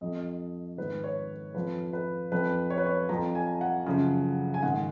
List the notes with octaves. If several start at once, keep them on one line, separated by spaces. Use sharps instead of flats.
F2 F3 D#5
G#2 D#3 B4
C#5
F2 F3 B4
B4
F2 F3 B4
C#5
B4
C#5
F2 F3 A#5
G#5
F#5
F#2 C#3 F3
G#5
G#2 D#3 F#5